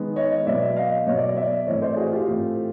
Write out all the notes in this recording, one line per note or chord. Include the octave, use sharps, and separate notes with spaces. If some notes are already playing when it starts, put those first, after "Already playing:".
Already playing: D#3 G#3 B3
C#5 D#5
B2 F#3 B3 D5 E5
D#5 F5
B2 F#3 B3 C#5 D#5
D5
D#5
D5 E5
A2 E3 A3 C4 C#5 D#5
C5 D5
F#4 G#4
F4 G4
A2 E3 A3 C4